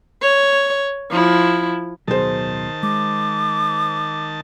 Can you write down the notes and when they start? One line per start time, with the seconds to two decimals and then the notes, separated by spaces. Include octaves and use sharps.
0.22 C#5
1.12 F3 E4
2.08 D1 B2 D#3 F#3 G#4 C5 A5
2.83 G#3 D6